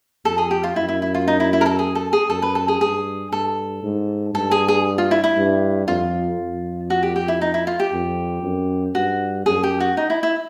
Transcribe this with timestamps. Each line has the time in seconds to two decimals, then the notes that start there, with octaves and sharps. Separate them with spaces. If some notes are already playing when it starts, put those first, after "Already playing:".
0.25 F2 A4
0.38 G#4
0.51 G4
0.64 F4
0.76 F#2 E4
0.89 E4
1.02 E4
1.15 F4
1.28 D#4
1.40 E4
1.53 E4
1.61 A#4
1.66 A4
1.79 G#4
1.95 A4
2.13 G#4
2.30 F#2 A4
2.42 B4
2.55 A4
2.68 G#4
2.81 G2 G#4
3.32 G2 A4
3.83 G#2
4.34 G2 A4
4.51 G#4
4.68 G#4
4.98 F4
5.11 E4
5.24 E4
5.37 G2
5.88 F2 F4
6.39 F2
6.90 F#4
7.03 G4
7.16 G4
7.28 E4
7.41 D#4
7.54 E4
7.67 F4
7.80 G4
7.93 F2
8.43 F#2
8.95 G2 F#4
9.46 F#2 G#4
9.63 G4
9.80 F#4
9.97 D#4
10.10 E4
10.23 E4